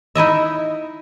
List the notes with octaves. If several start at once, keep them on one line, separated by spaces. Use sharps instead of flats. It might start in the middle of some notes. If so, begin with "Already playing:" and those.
D#4 E4 D#5 E5